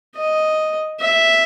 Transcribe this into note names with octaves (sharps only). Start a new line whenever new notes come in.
D#5
E5